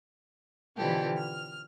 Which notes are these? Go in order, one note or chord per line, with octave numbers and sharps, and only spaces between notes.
B2 D3 E3 F3 G4 A4
F6